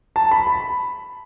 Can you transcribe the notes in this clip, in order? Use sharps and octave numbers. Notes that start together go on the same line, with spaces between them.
A5
B5
B5